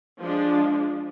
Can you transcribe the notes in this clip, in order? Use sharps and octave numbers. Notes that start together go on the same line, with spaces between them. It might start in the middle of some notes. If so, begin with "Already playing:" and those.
F3 G#3 D4